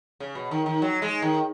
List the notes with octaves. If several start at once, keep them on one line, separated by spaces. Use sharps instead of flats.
C#3
B2
D#3
D#3
F#3
G#3
D#3